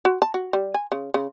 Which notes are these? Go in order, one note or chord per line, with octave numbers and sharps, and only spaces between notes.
F#4
A5
F#4
G3
G#5
C#3
C#3